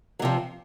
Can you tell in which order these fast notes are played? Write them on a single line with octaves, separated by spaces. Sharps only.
F#3 C3 F3